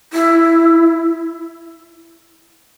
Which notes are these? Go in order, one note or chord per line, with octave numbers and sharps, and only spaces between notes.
E4